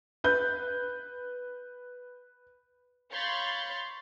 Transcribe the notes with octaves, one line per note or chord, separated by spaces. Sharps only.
B4 G6
C#5 F5 B5 C6 G6 A6